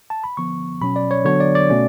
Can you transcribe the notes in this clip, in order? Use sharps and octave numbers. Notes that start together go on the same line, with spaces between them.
A5
B5
D3 F3 B3 C#6
B2 F#3 C#4 B5
D5
C#5
D3 F#3 B3 D4 C#5
D5
D5
B2 A3 C#4